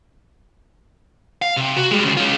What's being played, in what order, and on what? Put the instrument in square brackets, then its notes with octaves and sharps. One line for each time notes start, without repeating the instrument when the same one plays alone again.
[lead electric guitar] F5
C3
F#4
G3 G#3
D2 C#3
C#4 F4